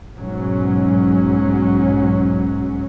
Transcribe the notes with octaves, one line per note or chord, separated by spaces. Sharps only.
B1 G#2 F#3 C#4